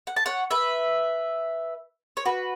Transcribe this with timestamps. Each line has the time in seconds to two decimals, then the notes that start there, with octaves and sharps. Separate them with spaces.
0.07 F#5
0.16 A5
0.26 C#5 F#5
0.51 B4 E5
2.17 C#5
2.26 F#4 B4